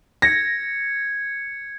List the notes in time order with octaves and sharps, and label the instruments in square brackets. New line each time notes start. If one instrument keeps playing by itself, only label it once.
[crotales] G#6 C#7 [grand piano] A#6